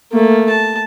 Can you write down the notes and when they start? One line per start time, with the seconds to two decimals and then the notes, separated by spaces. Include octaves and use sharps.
0.12 A3 A#3
0.49 A5